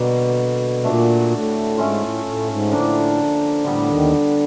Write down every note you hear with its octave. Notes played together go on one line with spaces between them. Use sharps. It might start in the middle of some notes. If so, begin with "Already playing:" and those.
Already playing: B2 D3 G3 A#3
A#2 A3 D4 F#4
A2
G#2 A3 C#4 F4
A2
A2
G#2
A2 D3 F3 A#3 D4
A2 D3 G3 B3
D#2 D#3